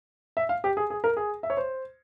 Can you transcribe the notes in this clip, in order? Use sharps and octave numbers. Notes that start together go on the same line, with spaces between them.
E5
F5
G4
G#4
G#4
A#4
G#4
E5
C#5
C5